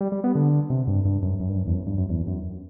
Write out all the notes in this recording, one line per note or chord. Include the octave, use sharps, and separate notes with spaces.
G3
G3
B3
D3
C3
G2
G2
F#2
F#2
G2
F#2
E2
F#2
G2
F#2
E2
F#2